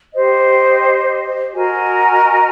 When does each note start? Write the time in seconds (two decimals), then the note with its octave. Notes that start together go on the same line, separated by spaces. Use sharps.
0.14 G4 C5 D#5
1.53 F#4 A#4 D#5 G#5